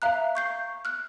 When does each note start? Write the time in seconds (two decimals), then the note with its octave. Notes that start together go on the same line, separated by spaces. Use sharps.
0.02 E5 F5 A#5 F#6
0.35 C#6 G6 C7
0.85 F6 F#6